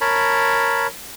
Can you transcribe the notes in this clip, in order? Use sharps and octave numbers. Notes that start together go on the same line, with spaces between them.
A#4 C#5 A5 B5